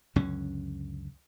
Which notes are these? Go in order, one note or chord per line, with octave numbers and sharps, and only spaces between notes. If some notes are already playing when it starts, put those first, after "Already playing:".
C#2 F#2 D3 C#4